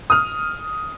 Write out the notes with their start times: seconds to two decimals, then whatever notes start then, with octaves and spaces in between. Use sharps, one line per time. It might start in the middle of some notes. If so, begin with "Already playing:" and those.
0.10 D#6 F6